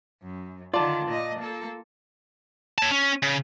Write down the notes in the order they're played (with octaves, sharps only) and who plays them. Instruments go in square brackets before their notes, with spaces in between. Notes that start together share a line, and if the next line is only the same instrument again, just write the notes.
[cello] F#2
[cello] D3 D#3 [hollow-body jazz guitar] F4 [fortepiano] D5 A5
[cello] A#2 D#5
A#3 A4
[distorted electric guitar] C#5 A5
C#4
C#3